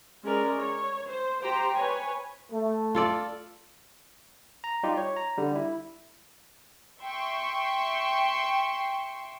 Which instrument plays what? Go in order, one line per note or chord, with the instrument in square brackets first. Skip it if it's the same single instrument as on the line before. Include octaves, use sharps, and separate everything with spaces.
[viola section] G#3 C#4 A#4 D5
C#5
C5
G4 C5 G5 A#5
B4 C#5 G#5
[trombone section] A3
[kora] F4 A4 D5
[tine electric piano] A#5
G3 D#4 F4 G4
C#5
A#5
D3 G3
E4
[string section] E5 G5 C6 C#6